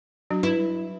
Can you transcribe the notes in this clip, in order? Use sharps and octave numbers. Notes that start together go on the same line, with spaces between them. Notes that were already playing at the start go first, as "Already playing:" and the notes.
F#3 D4 F#4
E4 B4